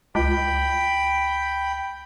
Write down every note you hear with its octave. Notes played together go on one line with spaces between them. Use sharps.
C#2 G5 B5